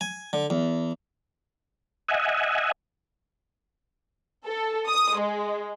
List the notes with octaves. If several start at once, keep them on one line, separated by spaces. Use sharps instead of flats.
G#5
D3
E2
D#5 E5 F#5 G#5
A4
D#6
G#3